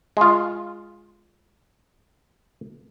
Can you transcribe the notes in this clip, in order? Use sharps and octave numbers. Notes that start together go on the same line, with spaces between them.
G#3 F4